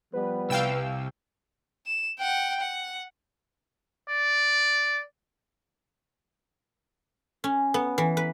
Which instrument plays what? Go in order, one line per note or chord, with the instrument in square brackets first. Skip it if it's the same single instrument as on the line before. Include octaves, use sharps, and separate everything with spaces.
[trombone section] F3 G3 B3 [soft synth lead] B4
[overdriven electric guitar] C2 [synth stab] F5 G5 E6
[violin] E7
F#5 G5
F#5
[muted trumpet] D5
[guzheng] C#4
B3
E3
B4